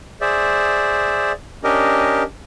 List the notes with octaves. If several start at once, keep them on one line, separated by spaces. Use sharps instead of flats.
G#4 C5 D5 E5
C#4 D4 G4 A#4 D#5